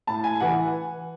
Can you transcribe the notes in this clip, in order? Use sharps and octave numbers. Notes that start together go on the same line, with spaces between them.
A2 A5
G#5
E3 F#5